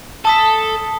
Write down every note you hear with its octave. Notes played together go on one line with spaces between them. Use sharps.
A4 A5 D#6 B6